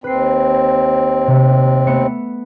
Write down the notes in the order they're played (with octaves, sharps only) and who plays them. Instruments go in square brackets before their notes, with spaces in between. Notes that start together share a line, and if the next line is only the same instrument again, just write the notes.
[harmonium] D#2 C4 [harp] B4 C7
[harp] C3 A3
A3 B3 C#7